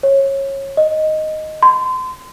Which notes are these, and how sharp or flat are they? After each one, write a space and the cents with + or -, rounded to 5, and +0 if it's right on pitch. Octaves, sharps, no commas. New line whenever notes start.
C#5 -20
D#5 +0
C6 -30